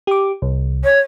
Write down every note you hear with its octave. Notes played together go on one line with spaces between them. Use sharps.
G4 D6
C2
C#5